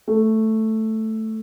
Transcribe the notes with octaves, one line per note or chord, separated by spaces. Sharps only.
A3